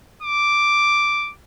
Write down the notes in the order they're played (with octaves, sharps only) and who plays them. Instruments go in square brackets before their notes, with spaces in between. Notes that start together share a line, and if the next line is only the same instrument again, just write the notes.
[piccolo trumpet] D6